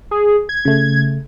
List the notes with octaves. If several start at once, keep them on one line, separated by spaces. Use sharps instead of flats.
G#4
G#6
C#3 A3